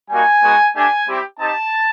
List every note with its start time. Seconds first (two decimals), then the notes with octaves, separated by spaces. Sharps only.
0.10 G3 A#3 D#4 F#4 G#5
0.42 G#3 B3 D#4 F#4
0.75 A3 D4 G4 G#5
1.08 G3 C4 E4 G4
1.40 C4 D#4 G4 A5